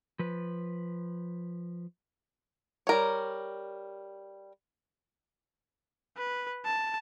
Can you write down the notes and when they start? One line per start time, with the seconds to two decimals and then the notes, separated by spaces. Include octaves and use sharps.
0.19 F3 B4
2.87 G3 A#4 C#5
6.17 B4
6.65 A5